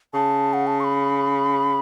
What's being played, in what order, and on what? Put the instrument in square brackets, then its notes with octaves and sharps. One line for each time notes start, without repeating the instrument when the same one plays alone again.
[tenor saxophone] C#3 [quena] A5
[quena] F#5
A5
C#6
B5